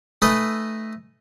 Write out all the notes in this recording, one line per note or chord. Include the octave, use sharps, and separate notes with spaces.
A3 D#4 A4 B4 D#5 G#5